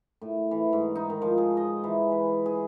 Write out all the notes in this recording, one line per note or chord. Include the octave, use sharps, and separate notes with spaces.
A2
E3
G#2
D#4
D#3
F3
G#4
D#5
E3
B4
G#4